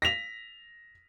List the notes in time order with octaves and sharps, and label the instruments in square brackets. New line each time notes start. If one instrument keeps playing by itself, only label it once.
[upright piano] A#6 B6 F7